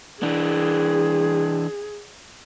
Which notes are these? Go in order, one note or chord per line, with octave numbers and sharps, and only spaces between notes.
E3 D4 G#4